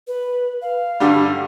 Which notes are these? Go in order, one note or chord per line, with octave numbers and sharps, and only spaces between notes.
B4
F5
G2 D3 G3